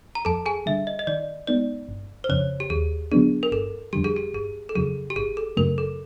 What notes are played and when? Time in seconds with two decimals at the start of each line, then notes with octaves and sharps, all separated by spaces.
0.15 A#5
0.25 F2 A4 A5
0.46 G#4 G#5
0.66 D3 G3 E5
0.87 D#5
0.99 D#5
1.07 D#3 D5
1.47 G#3 B3 D#4 D5
1.89 G1
2.24 C5
2.29 F2 C#3 C#5
2.60 G4
2.70 D#2 G#4
3.12 D3 F#3 B3 D4 G#4
3.43 A#4
3.52 G1 A4
3.93 F2 D3 G3 G4
4.04 G#4
4.16 G4
4.34 G1 G#4
4.69 A4
4.75 F2 C#3 F#3 G#4
5.10 G4
5.16 G#1 G#4
5.37 A4
5.57 F#2 C#3 F#3 A3 A#4
5.78 A4